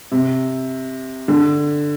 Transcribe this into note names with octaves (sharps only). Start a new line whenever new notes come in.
C3
D3